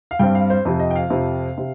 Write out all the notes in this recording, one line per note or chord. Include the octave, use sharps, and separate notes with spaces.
F5
G2 G3 C4 G5
F5
C5
F2 C3 F3 C5
D#5
G5
F5
F2 C3 F3
C3